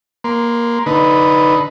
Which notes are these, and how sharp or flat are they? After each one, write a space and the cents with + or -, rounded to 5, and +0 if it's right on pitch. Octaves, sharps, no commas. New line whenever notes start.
A#3 +15 C6 -15
D3 -10 D#4 +5 B4 +0